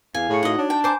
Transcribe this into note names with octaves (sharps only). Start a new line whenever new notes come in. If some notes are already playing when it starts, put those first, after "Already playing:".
E2 E4 F5 G#5
A2 G#4 C#6 C#7
D#4 F#4 D#5 F#5
D4 C#5
G5 A5
C5 G#5 A#5 D6 G6